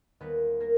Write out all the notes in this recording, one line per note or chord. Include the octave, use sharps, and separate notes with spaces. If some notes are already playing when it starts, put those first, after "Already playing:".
D#2 D#3 G3 B3 B4
A#3 A#4